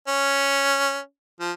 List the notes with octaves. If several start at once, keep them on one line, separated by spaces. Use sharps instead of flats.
C#4
F3